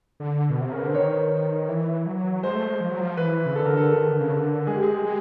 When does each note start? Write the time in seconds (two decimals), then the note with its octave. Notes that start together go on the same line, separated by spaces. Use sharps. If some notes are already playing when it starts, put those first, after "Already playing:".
0.20 D3
0.50 B2
0.61 C3
0.71 C#3 A#4
0.78 B4
0.83 D3 C5
0.94 D#3 C#5
1.69 E3
2.06 F#3
2.43 G#3 C5
2.55 A3
2.67 G#3
2.81 F3
2.90 F#3
3.01 F3
3.17 E3 B4
3.46 C#3
3.56 D3 A4
3.66 A#4
3.77 A4
3.92 D#3 A4
4.07 D3
4.20 C#3
4.33 D3
4.67 G#3 G#4
4.74 G4
4.83 G#4
5.05 G#3 G4